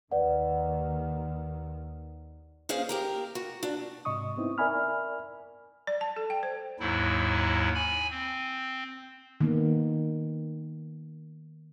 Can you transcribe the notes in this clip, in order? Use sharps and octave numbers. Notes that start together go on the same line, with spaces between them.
D#2 D#3 B4 D5 F#5
A#3 C#4 G#4 C5 F5
G4 A#4 A#5
F#4
D4
G#2 C3 D#5 C#6 D#6
B3 C4 D#4 E4
A#4 D5 E5 G#5 B5 F6
D5
A5
A4
G5
C5
D#2 G#2 F#3 E4
G#5 B5
C4
D#3 A#3 B3